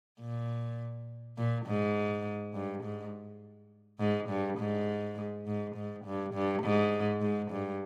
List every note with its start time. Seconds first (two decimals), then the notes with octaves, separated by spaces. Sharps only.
0.20 A#2
1.38 A#2
1.66 G#2
2.54 G2
2.84 G#2
4.00 G#2
4.29 G2
4.59 G#2
5.47 G#2
5.76 G#2
6.05 G2
6.34 G2
6.63 G#2
7.21 G#2
7.52 G2